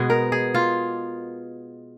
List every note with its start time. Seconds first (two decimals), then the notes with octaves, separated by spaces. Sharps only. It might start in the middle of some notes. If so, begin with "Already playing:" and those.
Already playing: B2 G#3 B3 G#4
0.10 A#4
0.32 G#4
0.54 F4